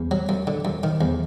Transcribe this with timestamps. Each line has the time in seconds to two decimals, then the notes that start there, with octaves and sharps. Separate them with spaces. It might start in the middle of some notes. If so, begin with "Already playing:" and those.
Already playing: E2
0.11 F#3
0.29 F#2
0.47 D3
0.65 F#2
0.83 D#3
1.01 E2